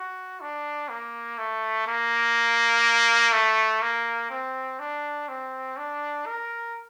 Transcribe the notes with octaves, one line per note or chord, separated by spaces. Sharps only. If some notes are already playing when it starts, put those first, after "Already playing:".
Already playing: F#4
D4
A#3
A3
A#3
A3
A#3
C4
D4
C4
D4
A#4